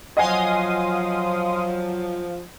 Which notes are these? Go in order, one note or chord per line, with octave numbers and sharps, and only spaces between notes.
F3 F#3 D#5 F5 F#5 G#5 C6 D#6